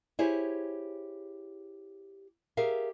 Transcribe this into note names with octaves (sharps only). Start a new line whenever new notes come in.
E4 G4 G#4 C5 C#5
G4 G#4 A#4 E5 F5